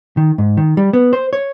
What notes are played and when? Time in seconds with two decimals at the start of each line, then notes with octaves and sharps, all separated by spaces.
0.17 D#3
0.38 G#2
0.57 D#3
0.77 G3
0.93 B3
1.13 C5
1.33 C#5